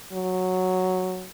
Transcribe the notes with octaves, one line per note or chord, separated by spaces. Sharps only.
F#3